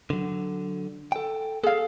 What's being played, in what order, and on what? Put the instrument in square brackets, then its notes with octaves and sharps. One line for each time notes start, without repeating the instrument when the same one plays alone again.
[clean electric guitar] D3 F#3
A4 G5
[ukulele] G#4 F5 [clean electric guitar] A4